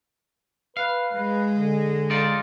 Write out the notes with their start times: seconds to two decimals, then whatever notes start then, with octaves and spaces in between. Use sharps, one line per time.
0.77 B4 F5
1.13 G#3 B4
1.51 D3
2.10 D#4 F4 D5